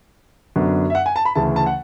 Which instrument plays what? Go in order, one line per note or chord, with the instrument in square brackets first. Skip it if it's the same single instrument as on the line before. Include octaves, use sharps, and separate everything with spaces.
[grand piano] F#2 D3 F#3 B3 D4
E5
F#5
G#5
A5
B5
D2 C#3 E3 A5
A5
F#5